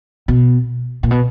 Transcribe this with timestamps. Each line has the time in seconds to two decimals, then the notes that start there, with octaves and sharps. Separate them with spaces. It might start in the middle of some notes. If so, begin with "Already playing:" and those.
0.28 B2
1.03 A#2
1.11 B2